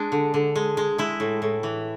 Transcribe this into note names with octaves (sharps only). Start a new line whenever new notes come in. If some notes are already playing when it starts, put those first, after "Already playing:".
Already playing: G#3 D4
D3
D3
G#3
G#3
G#3 E4
A2
A2
E3